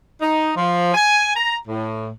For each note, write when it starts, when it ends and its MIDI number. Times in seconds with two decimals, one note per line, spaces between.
0.21 0.51 63
0.56 0.94 53
0.94 1.32 80
1.35 1.54 82
1.67 2.09 45